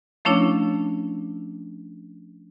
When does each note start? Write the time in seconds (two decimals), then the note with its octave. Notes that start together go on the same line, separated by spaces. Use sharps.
0.25 F3 A3 C#4 D4 E4 C#5